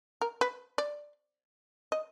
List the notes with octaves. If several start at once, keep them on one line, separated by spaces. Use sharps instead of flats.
A#4
B4
D5
D#5